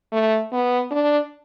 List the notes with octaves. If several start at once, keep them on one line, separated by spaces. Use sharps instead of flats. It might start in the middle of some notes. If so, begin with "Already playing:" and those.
A3
B3
D4